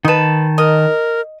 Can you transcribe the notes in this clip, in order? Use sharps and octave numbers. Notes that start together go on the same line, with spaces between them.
D#3 D#4 B4 A5
A#4 D#5